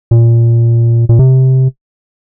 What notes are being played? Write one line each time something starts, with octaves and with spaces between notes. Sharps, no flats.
A#2
A#2
C3